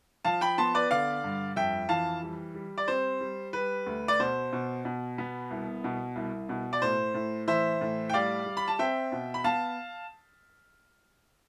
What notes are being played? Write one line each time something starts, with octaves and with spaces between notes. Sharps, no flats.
F3 F5 A5
G5 B5
B3 A5 C6
B4 D5
D3 D5 F5
G2
F2 E5 G5
E3 F5 A5
G3
G3
D5
C4 C5
G3
G3 B4
D2
D5
B2 C5
B2
B2
B3
C2
B2
C2
B2
D5
A2 C5
A2
E3 C5 E5
A2
G5
G3 D5 F5
G3
B5
A5
C4 E5 G5
B2
B5
B3 F5 A5